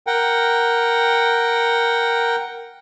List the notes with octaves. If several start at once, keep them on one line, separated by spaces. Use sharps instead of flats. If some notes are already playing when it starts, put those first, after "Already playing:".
A#4 F#5 G5